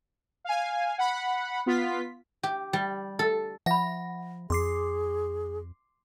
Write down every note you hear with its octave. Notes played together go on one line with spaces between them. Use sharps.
F5 G#5
F#5 B5
B3 F4 B6
G4
G3
A4
F3 E5 F#5 B5 A#6
F2 G#4 C6 D6 C7